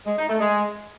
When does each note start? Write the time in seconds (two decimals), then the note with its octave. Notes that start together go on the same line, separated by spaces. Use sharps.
0.06 G#3
0.18 D#4
0.29 A3
0.40 G#3